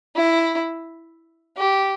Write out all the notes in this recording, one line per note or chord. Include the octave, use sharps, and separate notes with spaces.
E4
G4